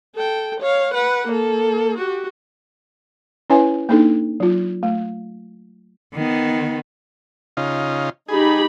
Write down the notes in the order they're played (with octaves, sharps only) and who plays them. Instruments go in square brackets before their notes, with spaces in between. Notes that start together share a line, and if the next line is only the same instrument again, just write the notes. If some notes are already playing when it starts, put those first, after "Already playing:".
[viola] A4 G5
C#5 F5
B4 F#5
A#3 A4
F#4 G4
[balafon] C#4 E4 B4 C#5 E5 G#5
A#3 D4 D#4 A4
F#3 F4
A3
[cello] D#3 B3
[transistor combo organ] C#3 D#4 F4
[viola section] D#4 G4 B5 [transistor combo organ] G#4